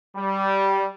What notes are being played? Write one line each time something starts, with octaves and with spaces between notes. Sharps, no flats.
G3